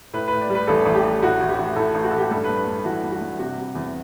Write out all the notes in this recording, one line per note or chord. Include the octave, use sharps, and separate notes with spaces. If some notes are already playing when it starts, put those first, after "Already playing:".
A2 B4
A2 B4
D5
G3
B4
A1 A4
A1
G4
A1
A2 F#4
A1
G4
A1
A2 A4
A1
F#4
A1 A4
G4
G2 A4
B4
G2
B4
G2
E3 F#4
G2
F#4
G2
C3 F#4
C3
E2